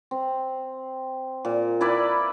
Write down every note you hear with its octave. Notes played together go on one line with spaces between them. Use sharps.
C4
A#2
E4 A#4 B4 D5